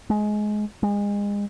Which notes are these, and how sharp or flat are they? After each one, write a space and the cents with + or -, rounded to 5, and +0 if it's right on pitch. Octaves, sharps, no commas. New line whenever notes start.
G#3 +20
G#3 -30